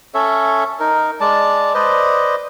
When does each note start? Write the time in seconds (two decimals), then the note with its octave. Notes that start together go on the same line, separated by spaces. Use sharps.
0.14 C#4 A4 C#5 E5
0.80 D#4 A#4
1.21 G#3 D5 A5
1.74 B4 C5 D5 D#5